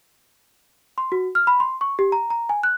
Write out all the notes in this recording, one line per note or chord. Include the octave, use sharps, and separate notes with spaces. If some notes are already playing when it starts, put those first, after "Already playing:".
C6
F#4
F6
B5
C6
C#6
G4
A#5
A#5
G#5
F#6